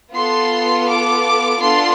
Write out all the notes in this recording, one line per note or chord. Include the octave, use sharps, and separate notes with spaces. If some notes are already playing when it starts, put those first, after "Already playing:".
B3 F4 A4 C6
D6
B3 D4 F4 A4 C6